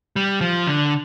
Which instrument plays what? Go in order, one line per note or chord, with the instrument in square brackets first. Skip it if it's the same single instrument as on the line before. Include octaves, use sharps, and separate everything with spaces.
[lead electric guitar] G3
F3
D3